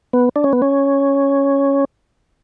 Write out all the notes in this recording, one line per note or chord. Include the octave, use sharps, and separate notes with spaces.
B3
D4
C#4
B3
C#4